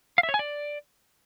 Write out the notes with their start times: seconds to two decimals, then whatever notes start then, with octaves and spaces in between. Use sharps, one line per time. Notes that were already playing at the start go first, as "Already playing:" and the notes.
0.18 F5
0.23 E5
0.29 C#5
0.34 G#5
0.39 D5